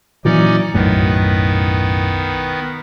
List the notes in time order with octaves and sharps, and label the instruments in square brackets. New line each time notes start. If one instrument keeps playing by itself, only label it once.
[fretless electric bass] A#2 E3 F#3 [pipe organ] C#4 D#4 D5
[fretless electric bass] B1 F#2 A2 [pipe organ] D#3 B3